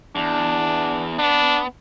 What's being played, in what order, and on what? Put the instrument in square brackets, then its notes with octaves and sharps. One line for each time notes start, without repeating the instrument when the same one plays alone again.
[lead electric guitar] E2 [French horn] D4
[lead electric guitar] B3 [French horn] D4